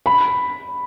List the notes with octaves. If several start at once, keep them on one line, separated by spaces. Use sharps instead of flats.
B5